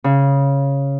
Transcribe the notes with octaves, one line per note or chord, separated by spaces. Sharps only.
C#3